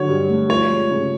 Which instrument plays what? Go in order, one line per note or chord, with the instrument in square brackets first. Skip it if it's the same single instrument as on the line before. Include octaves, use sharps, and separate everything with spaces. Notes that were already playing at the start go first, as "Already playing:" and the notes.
Already playing: [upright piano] D3 F#3 [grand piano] C#5
[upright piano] G2
A3
[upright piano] F3 [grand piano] C#5
[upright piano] G#3
C#3